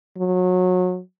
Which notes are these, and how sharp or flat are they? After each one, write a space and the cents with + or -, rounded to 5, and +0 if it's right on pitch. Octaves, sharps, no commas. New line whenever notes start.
F#3 -25